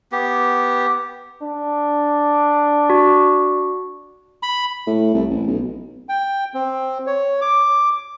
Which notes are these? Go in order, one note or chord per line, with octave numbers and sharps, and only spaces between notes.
B3 G4
D4
F#4
B5
A2
C2
A1
B1
G5
C4
C#5
D6